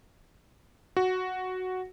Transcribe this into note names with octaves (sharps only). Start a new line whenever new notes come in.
F#4